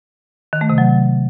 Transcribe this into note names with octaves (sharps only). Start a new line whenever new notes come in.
D#3
A3
C3
F#3